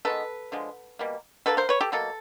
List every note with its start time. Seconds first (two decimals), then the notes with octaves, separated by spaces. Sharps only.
0.05 D#3 G#3 B3 A4 B4
0.52 D3 F3 G#3
0.99 B2 G3 A#3
1.46 D3 G3 A#3 A4 B4
1.57 A#4 C5
1.69 B4 C#5
1.81 G4 A4
1.92 B2 F#3 A#3 A4